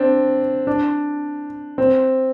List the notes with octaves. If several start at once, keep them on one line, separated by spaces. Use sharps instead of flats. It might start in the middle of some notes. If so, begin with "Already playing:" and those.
Already playing: C4 D4
D4
C4